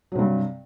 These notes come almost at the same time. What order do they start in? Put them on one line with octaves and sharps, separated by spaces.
F#3 C3 G2